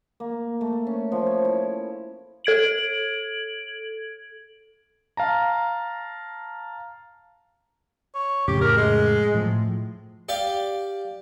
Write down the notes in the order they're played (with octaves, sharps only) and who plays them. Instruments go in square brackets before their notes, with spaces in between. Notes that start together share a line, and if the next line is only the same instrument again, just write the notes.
[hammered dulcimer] A#3
A3
C#4
F3
C#5
E4
[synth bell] A4 G#6 D7 F#7
[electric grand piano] F5 A5 A#5
[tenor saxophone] C#5
[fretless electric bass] F2 A2 C#3 [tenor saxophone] G4
[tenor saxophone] A#4
G#3
[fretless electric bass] A2 F3
[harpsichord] G4 D5 F5